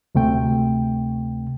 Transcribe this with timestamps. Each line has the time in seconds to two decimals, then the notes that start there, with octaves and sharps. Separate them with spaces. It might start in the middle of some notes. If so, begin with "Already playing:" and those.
0.15 D2 C3 A3 G5